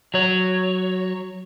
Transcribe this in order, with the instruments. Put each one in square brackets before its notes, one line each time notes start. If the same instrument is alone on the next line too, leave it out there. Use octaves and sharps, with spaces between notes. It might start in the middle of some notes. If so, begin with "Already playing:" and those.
[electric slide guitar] F#3 C#5